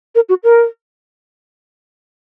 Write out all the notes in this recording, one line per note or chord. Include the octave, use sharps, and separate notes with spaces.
A#4
F#4
A#4